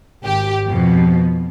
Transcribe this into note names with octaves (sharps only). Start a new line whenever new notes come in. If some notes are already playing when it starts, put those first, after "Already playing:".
G#1 G4
F2 B2